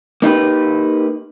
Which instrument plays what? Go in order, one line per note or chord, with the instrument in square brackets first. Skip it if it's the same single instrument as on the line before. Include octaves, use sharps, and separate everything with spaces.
[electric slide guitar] A#3 D#4 G4 B4